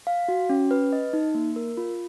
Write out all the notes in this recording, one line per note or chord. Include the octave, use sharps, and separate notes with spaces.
F5
F#4
C#4
B4
D#5
D#4
A#3
A#4
F4